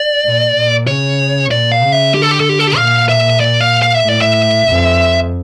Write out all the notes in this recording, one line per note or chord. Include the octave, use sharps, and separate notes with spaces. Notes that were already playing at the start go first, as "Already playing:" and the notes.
Already playing: D5
A#2
A#2
C#3 C#5
A#2 D5
F5
C#3
E5
D3 G4
A4
G4
A4
G4
A4
G4
A#2 F5
E5
D5
F5
F5
E5
A2
D5
E5
F2